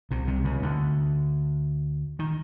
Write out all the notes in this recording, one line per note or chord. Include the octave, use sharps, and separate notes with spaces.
C2 C3
C2 C3
C#2 C#3
D2 D3
D#3